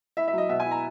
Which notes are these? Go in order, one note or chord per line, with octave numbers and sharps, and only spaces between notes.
E4 E5
E5
F#3 D#5
B2 E5
G#5
E4
A#5